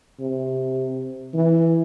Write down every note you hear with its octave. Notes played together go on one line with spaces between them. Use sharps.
C3
E3